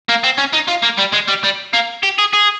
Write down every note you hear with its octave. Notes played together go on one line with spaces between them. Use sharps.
A#3
C4
C#4
D#4
F4
A#3
G3
G#3
G3
G3
A#3
G4
G#4
G#4